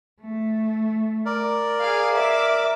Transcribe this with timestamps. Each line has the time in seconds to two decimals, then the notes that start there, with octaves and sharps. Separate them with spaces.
0.22 A3
1.26 A#4 D5
1.81 G#4 F5
2.16 E5 D6